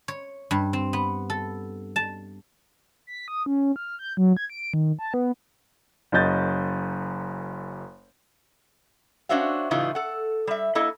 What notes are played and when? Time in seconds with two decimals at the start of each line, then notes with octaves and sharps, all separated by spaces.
0.08 C#5
0.51 G2
0.73 C4
0.93 B3
1.30 A4
1.96 A5
3.07 B6
3.28 D#6
3.46 C#4
3.76 F6
3.99 G6
4.17 F#3
4.37 G#6
4.50 D7
4.74 D#3
4.99 A5
5.14 B3
6.12 F#1 F#2 C#4 D#5 G6 A6
9.29 C#4 D4 F#4 C5 E5 F5
9.71 A2 C#3 E3 G3 D#4 F4
9.95 A4 F#5
10.47 G3 E5
10.75 A#3 E4 A4 D#5